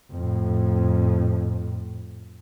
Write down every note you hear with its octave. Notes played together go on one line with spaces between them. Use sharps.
F2 A2